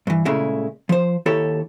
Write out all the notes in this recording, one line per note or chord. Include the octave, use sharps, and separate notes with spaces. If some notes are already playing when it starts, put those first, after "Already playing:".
G2 E3
A#2 C#3 G#3 A3 E4
F3 C5
D#2 E4 G4 A4 C#5